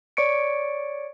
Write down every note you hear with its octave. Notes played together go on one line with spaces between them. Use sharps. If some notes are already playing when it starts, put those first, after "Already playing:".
C#5 D5 C#6 C#7 D7